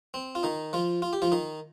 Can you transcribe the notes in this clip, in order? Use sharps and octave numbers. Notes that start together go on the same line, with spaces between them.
C4
F4
D#3 D#4
F3 F4
F4
G4
F3 F4
D#3 D#4